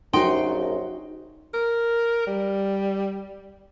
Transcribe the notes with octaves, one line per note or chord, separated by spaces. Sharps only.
A#1 F#2 D#4 F#4 C5 G5 C6
A#4
G3